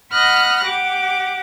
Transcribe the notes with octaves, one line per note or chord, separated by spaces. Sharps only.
D#5 F#5 B5 F6 F#6 A#6
G4 F#5 D6